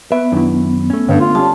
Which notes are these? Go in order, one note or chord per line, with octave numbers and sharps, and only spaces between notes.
B3 B4 E5
F#2 D#3 D4 E4
A3 C#4
G2 D3
F4
G3 C#4 A5